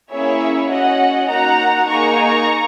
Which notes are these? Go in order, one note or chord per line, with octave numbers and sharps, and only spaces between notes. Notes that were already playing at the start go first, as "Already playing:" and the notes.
A#3 C#4 E4 G#4 C#5 E5
C#4 F#4 D#5 F#5
A#3 D#4 F#4 F#5 A#5
A#3 D#4 G#4 A#5 C#6